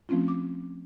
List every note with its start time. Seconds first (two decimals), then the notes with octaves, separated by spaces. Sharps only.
0.09 F3 A3 C4 C#4 F4
0.28 D6